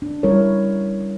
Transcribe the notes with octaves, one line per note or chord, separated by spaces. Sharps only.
D4
G3 C#4 E4 A#4 C#5